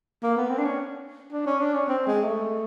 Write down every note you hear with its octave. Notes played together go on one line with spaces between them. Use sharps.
A#3
B3
C4
D4
C#4
D4
C#4
D4
C#4
C4
G#3
A3